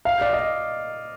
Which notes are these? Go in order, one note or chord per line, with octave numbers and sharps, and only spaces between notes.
F5
D5
D#5